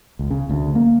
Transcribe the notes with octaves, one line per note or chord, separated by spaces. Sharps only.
C#2
C#3
D2
A#3